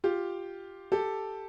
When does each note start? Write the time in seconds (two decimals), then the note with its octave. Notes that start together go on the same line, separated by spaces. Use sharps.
0.04 F4 G4
0.92 G4 A4